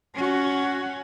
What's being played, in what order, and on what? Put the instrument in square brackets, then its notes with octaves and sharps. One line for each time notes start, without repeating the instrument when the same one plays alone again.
[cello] C#4 F#4